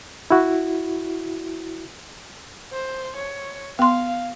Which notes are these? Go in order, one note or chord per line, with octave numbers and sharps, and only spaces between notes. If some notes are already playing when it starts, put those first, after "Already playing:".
E4 F#4
C5
C#5
B3 F5 C6